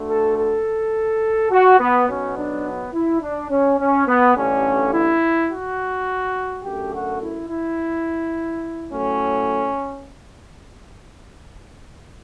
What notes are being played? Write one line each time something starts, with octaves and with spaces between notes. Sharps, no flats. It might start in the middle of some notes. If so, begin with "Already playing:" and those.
Already playing: D2 D3 A3
A4
A4
F#4
B3
B1 B2 F#3 B3 C#4
D4
E4
D4
C#4
C#4
B3
A1 G2 D3 C#4
E4
F#4
F#2 D3 A3 G4
F#4
E4
E4
A2 F#3 A3 C#4